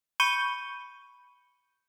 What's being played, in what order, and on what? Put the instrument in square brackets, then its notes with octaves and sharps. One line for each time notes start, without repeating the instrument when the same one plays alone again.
[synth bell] B5 C#6 G6 C#7 D#7 G7